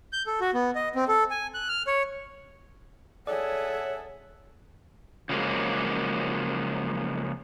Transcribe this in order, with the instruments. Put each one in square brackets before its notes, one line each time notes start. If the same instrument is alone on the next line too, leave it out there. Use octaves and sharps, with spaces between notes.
[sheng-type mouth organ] G6
A4
F#4
B3
D#5
C4
A4
G#5
F#6
F6
C#5
[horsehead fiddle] G#4 A4 [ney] C#5 [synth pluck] D5 [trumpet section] E5 F#5
[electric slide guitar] C#3 F3 F#3 G#3 A#3